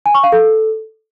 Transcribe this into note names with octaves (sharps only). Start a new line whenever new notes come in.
G#5
C#6
F5
A4